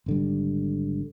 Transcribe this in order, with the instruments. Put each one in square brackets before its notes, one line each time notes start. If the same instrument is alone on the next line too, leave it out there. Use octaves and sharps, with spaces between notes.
[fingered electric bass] G#1 D3 G3